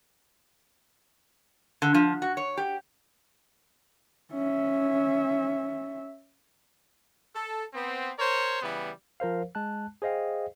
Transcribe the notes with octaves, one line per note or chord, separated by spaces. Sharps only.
D3
F3
F#4
C#5
G4
C#4 E5
A4
B3 C4
A#4 C5 C#5
C#3 E3 G3 B3
F3 A#4 C5 F5
G#3 A5 F#6
G#4 C5 D#5 F5 G5